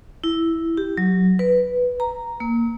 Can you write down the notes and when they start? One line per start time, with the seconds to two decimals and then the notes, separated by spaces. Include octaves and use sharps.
0.24 E4
0.77 G4
0.97 F#3
1.39 B4
2.00 A#5
2.40 A#3